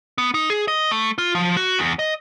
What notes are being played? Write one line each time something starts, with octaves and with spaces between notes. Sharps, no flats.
B3
D#4
G#4
D#5
A3
F4
F3
F#4
E2
D#5